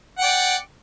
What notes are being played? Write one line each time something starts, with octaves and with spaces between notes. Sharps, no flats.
D5 F#5 G5